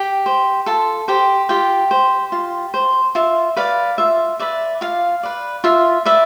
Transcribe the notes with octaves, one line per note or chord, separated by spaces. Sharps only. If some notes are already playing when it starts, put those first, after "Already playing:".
Already playing: G4 G5
C5
F4 A4 A5
G4 C5 G5
F4 G4 G5
C5
F4
C5
F4 E5
B4 D5 F5
F4 E5
B4 D5 E5
F4 F5
B4 D5
F4 E5
B4 D5 E5